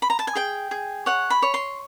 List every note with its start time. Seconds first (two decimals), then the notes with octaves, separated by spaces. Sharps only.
0.02 B5
0.10 A#5
0.19 A5
0.27 G#5
0.35 G#4 G5
0.71 G#4
1.06 C#5 F#5
1.30 B5
1.42 C#5
1.54 C6